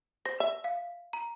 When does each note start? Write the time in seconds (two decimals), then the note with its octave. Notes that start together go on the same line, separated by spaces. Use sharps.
0.25 C5 A#6
0.40 E5
0.64 F5
1.13 A#5